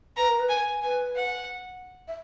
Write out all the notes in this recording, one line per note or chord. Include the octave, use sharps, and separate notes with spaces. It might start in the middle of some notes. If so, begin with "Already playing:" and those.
B4 A#5
A#4
B4
G#5
B4 G#5
F#5
E5